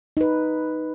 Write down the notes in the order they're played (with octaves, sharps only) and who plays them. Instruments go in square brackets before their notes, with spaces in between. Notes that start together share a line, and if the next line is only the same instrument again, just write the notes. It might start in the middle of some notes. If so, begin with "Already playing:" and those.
[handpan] D#4 B4